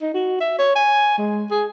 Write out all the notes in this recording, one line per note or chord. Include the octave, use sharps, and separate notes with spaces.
D#4
F#4
E5
C#5
G#5
G#3
G#4